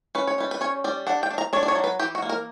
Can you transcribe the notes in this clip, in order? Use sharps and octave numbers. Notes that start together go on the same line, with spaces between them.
C#4 B4
C#5
G3 B4
B4
C#4 C#5
G3 D5
D4 F#5
G5
D4
A#5
D4 C#5
D5
C#5
F#3
B4
E3 G4
F#4
A#3
A#4